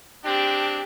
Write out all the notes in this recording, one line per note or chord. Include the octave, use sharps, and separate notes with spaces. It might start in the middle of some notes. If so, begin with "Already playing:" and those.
G#3 C4 D4 G4